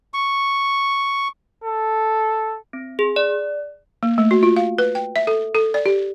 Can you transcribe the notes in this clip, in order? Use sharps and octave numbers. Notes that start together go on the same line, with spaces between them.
C#6
A4
C4
G#4
D5
A#3
A3
F#4
F4
F5
B4
G5
E5
A4
A4
D5
G4